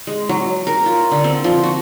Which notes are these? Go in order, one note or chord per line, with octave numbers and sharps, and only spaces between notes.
G#3
F#3
A#4
F4
D3
C4
F3
F#4